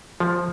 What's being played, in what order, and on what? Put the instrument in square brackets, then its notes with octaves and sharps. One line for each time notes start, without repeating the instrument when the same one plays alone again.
[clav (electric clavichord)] F3